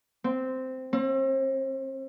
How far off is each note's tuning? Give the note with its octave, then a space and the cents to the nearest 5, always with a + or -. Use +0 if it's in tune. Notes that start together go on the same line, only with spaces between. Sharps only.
C4 -10
C4 +40